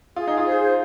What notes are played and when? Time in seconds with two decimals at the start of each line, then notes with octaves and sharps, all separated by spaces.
0.16 F4 G#4
0.27 D#4
0.38 F4
0.46 C5